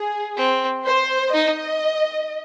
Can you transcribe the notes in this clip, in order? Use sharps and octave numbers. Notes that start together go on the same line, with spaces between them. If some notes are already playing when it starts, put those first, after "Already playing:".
Already playing: G#4
C4
C5
D#4 D#5